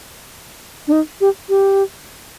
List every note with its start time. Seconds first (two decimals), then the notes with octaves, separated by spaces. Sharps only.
0.88 D4
0.92 D#4
1.21 G4
1.49 G4